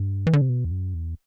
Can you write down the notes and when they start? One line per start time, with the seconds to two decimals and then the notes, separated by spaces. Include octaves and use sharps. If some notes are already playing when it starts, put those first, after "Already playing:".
Already playing: G2
0.27 E3
0.33 D3
0.41 C3
0.49 B2
0.65 E2
0.71 F#2
0.94 E2